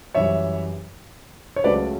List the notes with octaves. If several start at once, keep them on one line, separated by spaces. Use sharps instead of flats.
F#2 E3 G3 C#5 E5
C#5
C#2 C#3 F#3 A3 C#4 B4 D5